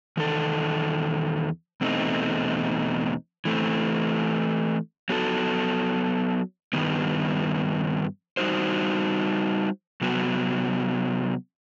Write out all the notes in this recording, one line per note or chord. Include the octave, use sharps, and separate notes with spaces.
E2 D#3 A4
E2 B2 A3 C4 D#4
E3 A3 C4
F#3 B3 F#4 A4
G2 D#3 G3 B3
G3 D#4 F#4 C5
C3 F#3 B3 F#4